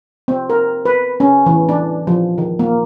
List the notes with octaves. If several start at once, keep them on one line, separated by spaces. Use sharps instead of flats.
C4
A#4
B4
C#4
E3
D4
F3
D#3
A#3